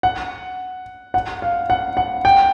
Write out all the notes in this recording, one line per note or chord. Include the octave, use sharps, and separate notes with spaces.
F#5
F#5
F5
F#5
F#5
G5